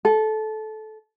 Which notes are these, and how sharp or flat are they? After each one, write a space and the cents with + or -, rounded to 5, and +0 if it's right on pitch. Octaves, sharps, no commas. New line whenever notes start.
A4 -20